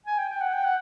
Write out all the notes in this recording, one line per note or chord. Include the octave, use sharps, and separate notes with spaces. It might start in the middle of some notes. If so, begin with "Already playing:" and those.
G#5
G5
G5
F#5
G5
F#5